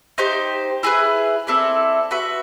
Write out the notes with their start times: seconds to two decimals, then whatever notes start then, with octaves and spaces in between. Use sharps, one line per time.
0.18 D#4 G4 C5
0.83 E4 G#4 B4
1.47 C4 E4 A4 D5
2.11 F#4 B4 E5